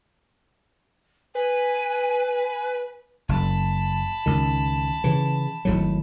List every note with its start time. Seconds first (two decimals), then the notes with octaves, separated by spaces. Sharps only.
1.35 B4 G#5
3.29 F#1 A5 B5
4.26 C#2 D#3
5.04 C#3 E3
5.65 G#1 A2 F#3